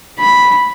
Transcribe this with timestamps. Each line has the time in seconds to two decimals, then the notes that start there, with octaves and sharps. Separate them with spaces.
0.20 B5